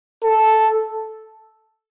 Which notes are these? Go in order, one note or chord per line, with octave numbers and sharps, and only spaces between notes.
A4